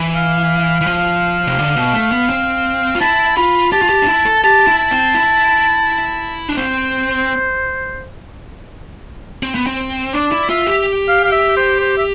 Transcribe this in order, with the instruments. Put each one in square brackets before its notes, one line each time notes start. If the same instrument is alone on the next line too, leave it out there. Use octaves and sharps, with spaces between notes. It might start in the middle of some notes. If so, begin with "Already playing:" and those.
Already playing: [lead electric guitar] E3
[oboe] F5
[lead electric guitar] E3
F3
C3
D3
B2
A3
B3
C4
F4
[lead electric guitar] E4 [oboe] A5
[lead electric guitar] F4 [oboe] B5
[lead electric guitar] G4 [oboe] A5
[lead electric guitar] F4
G4
D4
E4
A4
[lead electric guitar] G4 [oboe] A5
[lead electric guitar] E4
[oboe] A5
[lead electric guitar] C4
E4
D4
[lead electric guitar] C4 [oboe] C5
[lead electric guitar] C4
B3
C4
[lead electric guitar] D4 [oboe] D5
[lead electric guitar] E4
[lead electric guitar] F4 [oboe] E5
[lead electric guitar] G4
[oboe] F5
F5
E5
C5
C5
E5